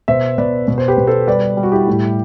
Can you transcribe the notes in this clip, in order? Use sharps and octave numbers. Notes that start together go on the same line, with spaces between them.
B2 C5 E5
B2 B4 D5
B2
C5
G4 B4
B2
A4 C5
G3 B4 D5
G3
F#4
E4 G4
A2